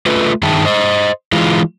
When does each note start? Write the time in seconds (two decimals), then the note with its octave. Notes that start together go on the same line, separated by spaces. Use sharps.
0.06 A3 F4 B4
0.43 G2 D#3 G#4 E5 G5 A5
0.65 C5 D#5
1.32 E3 G#3 F4